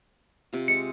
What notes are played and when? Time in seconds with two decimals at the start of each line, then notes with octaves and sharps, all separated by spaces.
0.53 C3 F4
0.68 G#3 C#7